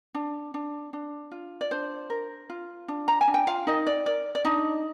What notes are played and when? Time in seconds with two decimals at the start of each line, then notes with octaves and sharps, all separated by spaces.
0.14 D4
0.54 D4
0.93 D4
1.31 F4
1.61 D5
1.71 D4 C5
2.10 A#4
2.50 F4
2.88 D4
3.08 A#5
3.21 G#5
3.27 D4
3.34 G5
3.47 F4 F5
3.67 D#4 A#4 D#5
3.87 D5
4.06 A#4 D5
4.35 D5
4.45 D4 D#4 D#5